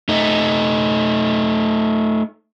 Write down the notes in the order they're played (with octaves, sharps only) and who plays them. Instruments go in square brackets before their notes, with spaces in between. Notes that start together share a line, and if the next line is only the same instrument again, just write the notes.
[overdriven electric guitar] A3 D#4